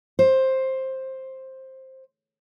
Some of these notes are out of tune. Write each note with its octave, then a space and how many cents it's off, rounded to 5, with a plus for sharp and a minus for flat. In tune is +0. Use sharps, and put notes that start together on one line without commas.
C5 +10